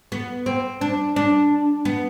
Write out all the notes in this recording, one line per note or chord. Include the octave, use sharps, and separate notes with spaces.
B3
C4
D4
D4
B3